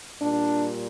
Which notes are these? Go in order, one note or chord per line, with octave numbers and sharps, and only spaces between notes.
A#2 G3 D4